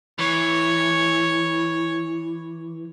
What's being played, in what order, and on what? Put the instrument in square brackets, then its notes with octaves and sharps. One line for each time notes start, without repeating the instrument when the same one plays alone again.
[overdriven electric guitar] E3 [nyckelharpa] C#5